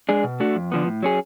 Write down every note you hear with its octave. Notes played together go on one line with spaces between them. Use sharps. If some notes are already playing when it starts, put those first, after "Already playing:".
G#3 D4 G#4
B2
A3 D4 F#4
F2
D3 F3 B3
A2
F#3 C#4 G#4